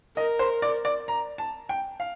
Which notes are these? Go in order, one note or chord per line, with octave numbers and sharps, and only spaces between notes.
A#4 D#5
C5
D5
D5
A#5
A5
G5
F5